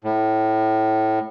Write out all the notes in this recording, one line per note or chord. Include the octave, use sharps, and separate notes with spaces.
A2